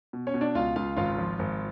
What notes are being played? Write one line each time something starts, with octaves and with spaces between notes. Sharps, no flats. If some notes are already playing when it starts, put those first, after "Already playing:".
B2
C#4 C#5
B2
D4 D5
C#2 F4 F5
C#2 F4 F5
G#1 F4 F5
F3
G#1